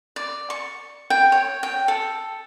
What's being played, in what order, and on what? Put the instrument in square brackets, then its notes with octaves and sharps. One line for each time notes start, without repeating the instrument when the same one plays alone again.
[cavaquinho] D5
C#6
G5
C#5
G5
A4